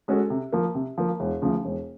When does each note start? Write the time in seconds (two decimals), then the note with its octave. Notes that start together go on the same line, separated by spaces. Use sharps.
0.08 G#3 C#4 F#4 A4
0.30 C3
0.53 F3 A#3
0.75 C3
0.98 F3 A#3
1.20 E1
1.42 D2 C#3 F3
1.65 E1